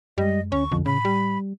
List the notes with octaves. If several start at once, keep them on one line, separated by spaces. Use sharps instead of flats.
F#2 G3 G#3 D#5
D2 C#4 C#6
B1 F2 D3 C#4
A2 C#3 B5
G3